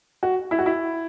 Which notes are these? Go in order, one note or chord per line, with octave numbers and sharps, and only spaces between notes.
F#4
E4
F#4
E4